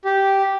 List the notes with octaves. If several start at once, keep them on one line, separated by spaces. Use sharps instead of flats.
G4